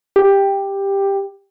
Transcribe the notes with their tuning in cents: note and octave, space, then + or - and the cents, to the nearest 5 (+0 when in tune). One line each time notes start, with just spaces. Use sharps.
G4 +10